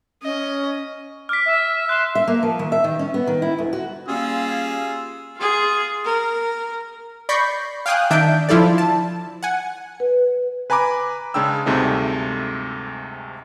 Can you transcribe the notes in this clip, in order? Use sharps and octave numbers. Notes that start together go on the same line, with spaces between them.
C#4 D#5
D6 F6 B6
E5
C6 F#6 E7
E5
A#3
F3
D#3
E5
D#3
C#4
B3
D#3
E4
D2
F#4
G3 A#3 C#4 F4 G#4 E6
F4 G#4
A#4
D5 B5 C#6 G6 A#6 C7
F5 G5 G#5 D#6 F#6
D#3 D4 E5 G6 D7
F3 E4 F4 A4 D5
A5
F#5 G#5
B4
B4 G#5 A#5 B5 D6
C#3 G#3 D4 G5 E6
D2 G2 C3 G#3 A3 D#4